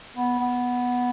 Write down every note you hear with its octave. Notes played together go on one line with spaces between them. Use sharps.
B3
B3